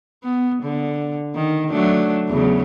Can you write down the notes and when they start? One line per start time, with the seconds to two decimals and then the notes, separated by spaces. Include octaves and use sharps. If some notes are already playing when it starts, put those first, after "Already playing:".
0.23 B3
0.63 D3
1.35 D#3
1.70 F#3 A3 D4
2.29 E2 C#3 F#3